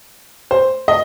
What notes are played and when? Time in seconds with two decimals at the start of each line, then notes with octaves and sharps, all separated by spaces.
0.51 C5
0.88 D#5